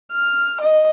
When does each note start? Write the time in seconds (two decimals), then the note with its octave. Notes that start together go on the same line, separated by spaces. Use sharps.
0.12 F6
0.61 D#5